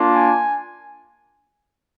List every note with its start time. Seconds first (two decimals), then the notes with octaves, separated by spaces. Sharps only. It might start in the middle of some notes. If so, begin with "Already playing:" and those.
Already playing: A#3 D4 F4
0.14 G#5